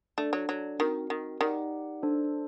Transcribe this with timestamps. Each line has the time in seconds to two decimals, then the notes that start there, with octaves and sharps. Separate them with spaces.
0.18 A3 D4 A4 D5
0.33 F#3
0.49 F#3
0.79 D#3 C4 F#4 A#4
1.10 D#3
1.41 D#3 D#4 G4 D5 F#5
2.02 D4 A4 C5